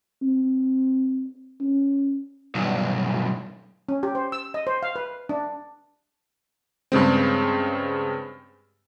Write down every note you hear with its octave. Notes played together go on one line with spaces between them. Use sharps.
C4
C#4
B1 G2
C#4
G4
C5
E6
D#5
C5
F5
B4
D4
G2 C#3 G#3 C4